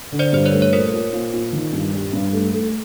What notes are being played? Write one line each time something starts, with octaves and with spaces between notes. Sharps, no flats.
D3
C5 D5
G2 C5
B4 C#5
A3
C#5
A#2 A#4 C5
A#2
A#2
A#2
D#3
G2
G3
G2
A3
A3